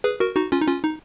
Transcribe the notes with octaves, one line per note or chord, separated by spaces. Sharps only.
G#4 B4
F#4 A#4
D#4 F#4
C#4 F4
D#4
C#4 F4
D#4